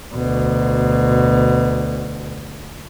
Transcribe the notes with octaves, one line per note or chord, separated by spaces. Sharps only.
D2 B2